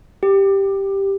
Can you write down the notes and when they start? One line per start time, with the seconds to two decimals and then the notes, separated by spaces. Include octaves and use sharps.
0.23 G4